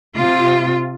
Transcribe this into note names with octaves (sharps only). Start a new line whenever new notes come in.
C3 F4